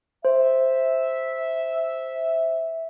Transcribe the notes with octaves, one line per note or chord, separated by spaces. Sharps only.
C5 E5